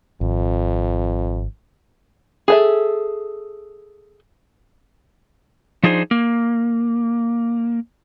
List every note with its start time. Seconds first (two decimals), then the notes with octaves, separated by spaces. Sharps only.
0.21 G#1 F2
2.48 G#4 A4 E5
5.83 F3 D4 D#4 G#4 C5
6.11 A#3